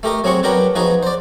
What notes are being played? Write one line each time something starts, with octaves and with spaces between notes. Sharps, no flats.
A3 G4 A#4 D#5
F#3 C4 G#4 F#5 C#6
F#3 B3 D4 A#4 G5 B5
F3 B3 D#4 F#4 G#4
C5 D5